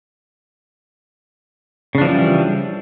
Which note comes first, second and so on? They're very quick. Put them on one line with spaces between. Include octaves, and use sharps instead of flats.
C#3 D4 F3 E3 G3